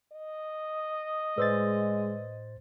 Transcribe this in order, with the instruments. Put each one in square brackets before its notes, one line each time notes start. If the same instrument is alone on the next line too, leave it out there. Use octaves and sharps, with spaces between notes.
[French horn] D#5
[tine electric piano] A2 C5 A6 [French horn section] G#3 [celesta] B4 D5 E6